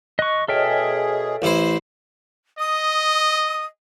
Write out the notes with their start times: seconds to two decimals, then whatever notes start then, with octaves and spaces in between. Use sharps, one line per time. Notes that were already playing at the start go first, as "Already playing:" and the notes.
0.19 D#5 C#6 F#6
0.48 B2 G#4 A4 C#5 D#5 E5 G5 F6
1.42 A1 E4 C5
2.59 D#5 D#6